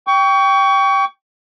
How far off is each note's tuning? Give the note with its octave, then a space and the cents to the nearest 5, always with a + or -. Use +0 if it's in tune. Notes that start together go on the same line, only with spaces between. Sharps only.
G5 +0 C#6 +30